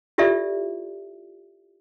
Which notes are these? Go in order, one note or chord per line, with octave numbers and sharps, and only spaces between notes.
E4 F4 G4 A4 D5 E5